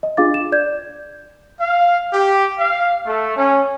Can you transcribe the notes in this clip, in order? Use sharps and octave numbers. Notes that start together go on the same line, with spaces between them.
D#5
D4 F4 G#4 F5 D6 A6
E7
D5 G6 G#6
F5
G4
F5
A3
C#4